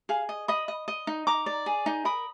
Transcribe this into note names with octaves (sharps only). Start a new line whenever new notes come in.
G#4 F5
D#5
D#5 B5 D#6
D#5
D#5
D#4
D#4 A#5 D6
D5
G#4
D#4
A#4 B5 D#6